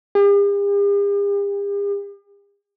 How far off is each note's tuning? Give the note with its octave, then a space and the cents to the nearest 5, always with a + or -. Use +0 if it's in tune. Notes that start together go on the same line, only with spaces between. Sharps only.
G4 +45